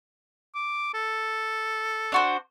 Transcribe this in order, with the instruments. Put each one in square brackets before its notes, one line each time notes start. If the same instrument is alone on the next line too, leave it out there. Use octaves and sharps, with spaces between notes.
[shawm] D6
A4
[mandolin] D4 F#4 C5